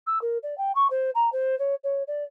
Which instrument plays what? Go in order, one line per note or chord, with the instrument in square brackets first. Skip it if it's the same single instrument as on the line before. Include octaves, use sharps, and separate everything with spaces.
[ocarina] E6
A#4
D5
G5
C#6
C5
A#5
C5
C#5
C#5
D5